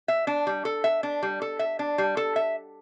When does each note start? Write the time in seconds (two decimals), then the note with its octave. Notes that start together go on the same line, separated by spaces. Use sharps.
0.08 E5
0.27 D4
0.47 G3
0.65 A4
0.84 E5
1.03 D4
1.23 G3
1.42 A4
1.59 E5
1.79 D4
1.98 G3
2.17 A4
2.36 E5